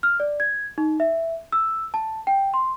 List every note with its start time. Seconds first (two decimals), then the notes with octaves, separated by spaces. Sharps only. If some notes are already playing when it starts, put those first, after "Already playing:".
0.03 F6
0.20 D5
0.40 G#6
0.78 D#4
1.00 E5
1.52 E6
1.94 A5
2.27 G5
2.54 C6